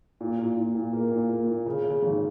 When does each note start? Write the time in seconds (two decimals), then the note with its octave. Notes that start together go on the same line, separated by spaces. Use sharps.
0.21 A#2
0.39 A#2
0.57 A#2
0.75 A#2
0.93 A#3
1.11 A#2
1.30 A#3
1.47 A#2
1.66 C#3
1.84 C#3
2.03 G#1